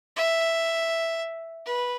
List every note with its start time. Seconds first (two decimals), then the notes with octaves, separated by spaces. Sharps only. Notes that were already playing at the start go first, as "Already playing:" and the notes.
0.16 E5
1.66 B4